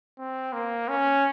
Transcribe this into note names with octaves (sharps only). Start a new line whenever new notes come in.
C4
A#3
C#4